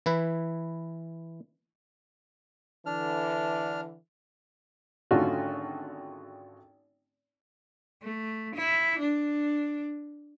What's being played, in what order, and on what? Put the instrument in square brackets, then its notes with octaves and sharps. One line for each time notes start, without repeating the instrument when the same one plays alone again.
[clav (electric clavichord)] E3 E4 B4
[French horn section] D3 E3 [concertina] D4 F6
[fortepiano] G#1 D3 A3 C#4 F4 F#4
[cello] A3
E4
D4